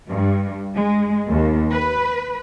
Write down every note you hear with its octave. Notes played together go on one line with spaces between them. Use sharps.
G2
G#3
D#2
B4